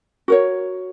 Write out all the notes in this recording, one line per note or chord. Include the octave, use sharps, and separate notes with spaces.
F#4 A#4 C#5